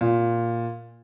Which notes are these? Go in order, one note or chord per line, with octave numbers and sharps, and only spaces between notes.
A#2